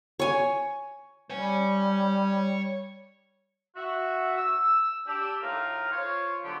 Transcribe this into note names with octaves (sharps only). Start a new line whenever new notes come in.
C#5 G#5
G3 C#5 G#5
F#4 E5
E6
D4 G4 E6
A2 D#4 F4 A#4 F5 F6
F4 C5 C#5
D3 F#3 B3 G4